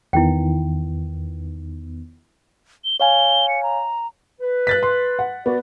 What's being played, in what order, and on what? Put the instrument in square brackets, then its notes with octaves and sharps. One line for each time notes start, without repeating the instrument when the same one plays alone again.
[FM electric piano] E2 D#3 B3 [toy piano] E4 G5
[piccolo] G7
[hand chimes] C#5 F5 G#5 [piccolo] G7
[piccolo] C#7
A#5
[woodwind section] B4
[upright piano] F#6 A6 B6
C6
F#5
[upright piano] B3 [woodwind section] F#4 D5